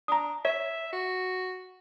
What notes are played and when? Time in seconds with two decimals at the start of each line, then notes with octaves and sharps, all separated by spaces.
0.08 D4 A#5 D#6
0.45 C#5 E5
0.93 F#4